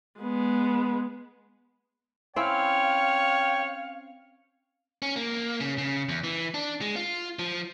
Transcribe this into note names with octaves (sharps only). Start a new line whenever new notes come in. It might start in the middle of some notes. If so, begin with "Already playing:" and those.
G#3 B3
C4 C#4 E4 C#5 F5 G5
C#4
A#3
C#3
C#3
E2
E3
D4
G#3
F4
F3